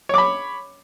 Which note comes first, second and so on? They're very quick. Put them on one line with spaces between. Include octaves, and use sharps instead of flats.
C#5 D6 B5